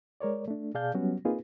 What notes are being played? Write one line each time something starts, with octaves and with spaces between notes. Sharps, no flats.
G#3 A#4 C#5 D5
A3 D4
B2 G#4 D5 F5 A5 G6
F#3 G3 B3 C#4 F#4
A#3 C4 D#4 F4 G#4 B4